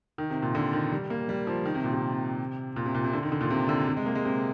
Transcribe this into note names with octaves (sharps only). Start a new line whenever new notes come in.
D#3
C3
A#2
D3
D#3
G3
A#3
G3
F3
D#3
C3
A#2
C3
A#2
C3
A#2
C3
D3
D#3
D3
A#2
C3
D3
C3
G#3
A#3
G#3
C3